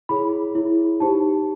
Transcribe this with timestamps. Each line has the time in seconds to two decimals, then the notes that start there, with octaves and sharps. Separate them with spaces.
0.09 E4 G#4 C#5 B5
0.55 E4 G#4 C#5
1.00 D#4 G4 C5 A5